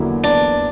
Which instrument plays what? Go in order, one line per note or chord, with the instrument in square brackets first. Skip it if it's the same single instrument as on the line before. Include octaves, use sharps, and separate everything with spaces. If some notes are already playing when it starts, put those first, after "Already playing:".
Already playing: [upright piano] E2 D3 F#3 A#3 E4
[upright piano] E2 [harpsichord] D4